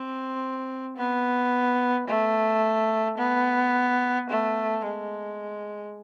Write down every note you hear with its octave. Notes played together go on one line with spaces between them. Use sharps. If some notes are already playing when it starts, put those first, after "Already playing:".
Already playing: C4
B3
A3
B3
A3
G#3